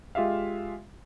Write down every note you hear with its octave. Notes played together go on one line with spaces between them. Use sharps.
G#3 F4 G4 E5 F5